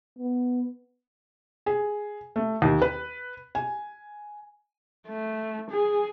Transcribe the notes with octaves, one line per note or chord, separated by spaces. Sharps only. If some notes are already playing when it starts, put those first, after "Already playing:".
B3
G#4
A3
D#2
B4
G#5
A3
G#4